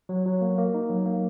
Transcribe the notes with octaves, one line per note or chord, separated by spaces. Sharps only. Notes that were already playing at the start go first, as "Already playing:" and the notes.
F#3
F#3
A#3
A#3
D#4
F#3
A#3